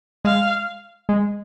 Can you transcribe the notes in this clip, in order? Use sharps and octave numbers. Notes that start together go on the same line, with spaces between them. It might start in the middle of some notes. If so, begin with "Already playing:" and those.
G#3 F5
G#3